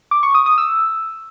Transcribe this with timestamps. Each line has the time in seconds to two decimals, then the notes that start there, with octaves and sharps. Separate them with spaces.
0.11 D6
0.23 C#6
0.35 D#6
0.46 D#6
0.58 E6